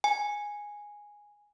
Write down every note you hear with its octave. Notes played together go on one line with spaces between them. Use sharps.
G#5